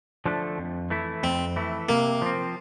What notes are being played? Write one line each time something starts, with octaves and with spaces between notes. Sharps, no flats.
D3 F3 A3 D4
F2
E3 A3 E4
F2 C4
E3 A3 E4
C3 A#3
F3 C4